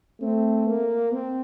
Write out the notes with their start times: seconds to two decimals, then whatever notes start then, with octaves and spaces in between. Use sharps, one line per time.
0.21 A3 C4
0.67 A#3
1.12 C4